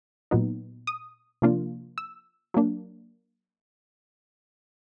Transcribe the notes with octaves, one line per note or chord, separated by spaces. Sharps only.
A#2 F#3 B3 D#4
D#6
C3 F3 A#3 D4 F4
E6
F#3 A#3 D4